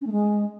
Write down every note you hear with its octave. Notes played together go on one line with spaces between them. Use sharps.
C#4
A3
G#3